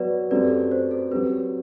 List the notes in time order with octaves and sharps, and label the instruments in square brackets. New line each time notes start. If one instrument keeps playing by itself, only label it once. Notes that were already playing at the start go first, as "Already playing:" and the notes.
Already playing: [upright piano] F#3 B3 F#4 [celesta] B4 D5
[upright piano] F#2 F#3 A3 C4 G4 [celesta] B4 D5
[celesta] C5
A4
[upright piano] F#3 C4 G4 [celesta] B4